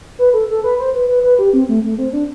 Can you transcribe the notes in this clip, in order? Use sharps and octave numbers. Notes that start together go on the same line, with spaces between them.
B4
A4
A4
B4
C5
B4
B4
B4
G4
C4
A3
A3
C4
D4